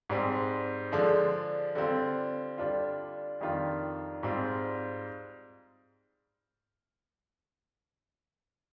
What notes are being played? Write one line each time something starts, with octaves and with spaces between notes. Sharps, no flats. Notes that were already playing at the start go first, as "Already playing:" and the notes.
G#2 G3 C4
D3 F3 G#3 D4
D3 G3 C4 F4
D3 G3 D4 F4
F2 D#3 G3 D4 F4
G#2 G3 C4 F4